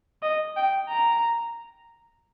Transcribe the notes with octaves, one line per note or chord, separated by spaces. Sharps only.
D#5
G5
A#5